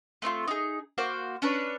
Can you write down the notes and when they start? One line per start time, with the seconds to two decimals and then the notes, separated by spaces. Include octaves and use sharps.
0.22 A3 C4 D#4 F4
0.48 D#4 G#4
0.98 A#3 F#4 C5
1.42 C#4 D4 B4 C#5